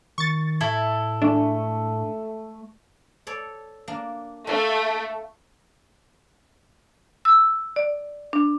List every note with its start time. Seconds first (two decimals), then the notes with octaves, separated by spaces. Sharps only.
0.18 D#3 C#6 A6
0.61 A2 E4 A4
1.22 A3 D4
3.27 A4 C#5 D5
3.88 A#3 D4
4.47 A3 F4
7.25 E6
7.76 D5
8.33 D4